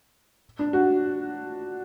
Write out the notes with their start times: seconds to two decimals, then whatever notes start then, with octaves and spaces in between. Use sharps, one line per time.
0.59 D4
0.73 F#4